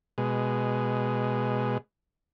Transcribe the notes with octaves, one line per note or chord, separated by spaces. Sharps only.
B2 G#3